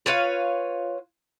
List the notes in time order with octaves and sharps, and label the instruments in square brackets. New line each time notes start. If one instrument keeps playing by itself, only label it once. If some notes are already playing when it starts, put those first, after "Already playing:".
[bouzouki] F4 B4 C#5 F5